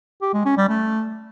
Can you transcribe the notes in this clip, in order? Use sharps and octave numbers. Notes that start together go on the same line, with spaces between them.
G4
G#3
C#4
G3
A3